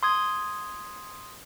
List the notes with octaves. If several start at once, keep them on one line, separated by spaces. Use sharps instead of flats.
C6 D#6 G#6